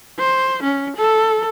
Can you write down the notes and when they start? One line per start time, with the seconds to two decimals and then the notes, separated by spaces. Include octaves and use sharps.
0.19 C5
0.63 C#4
0.96 A4